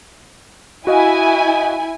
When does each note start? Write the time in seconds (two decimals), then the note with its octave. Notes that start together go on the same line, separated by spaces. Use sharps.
0.87 E4 F#4 D#5 F5 G#5